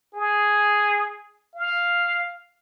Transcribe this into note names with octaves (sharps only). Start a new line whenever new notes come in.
G#4
F5